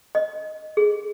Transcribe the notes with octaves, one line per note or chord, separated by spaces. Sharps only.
D#5
G#4